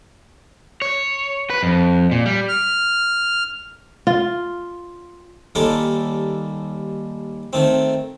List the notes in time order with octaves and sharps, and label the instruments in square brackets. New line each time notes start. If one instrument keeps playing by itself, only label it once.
[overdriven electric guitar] C#5
B4
F2
A#2
G3
[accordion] F6
[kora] F4
[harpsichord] D#2 G3 G#3 A4 A#4
D#3 A3 C4